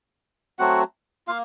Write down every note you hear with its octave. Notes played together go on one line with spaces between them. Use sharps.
F#3 A3 C4 F#4 F#5
A#3 F4 F5